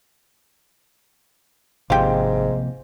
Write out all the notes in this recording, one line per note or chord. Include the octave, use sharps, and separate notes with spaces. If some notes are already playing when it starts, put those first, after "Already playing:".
G#1 G#2 C3 F3 A#3 F4 G4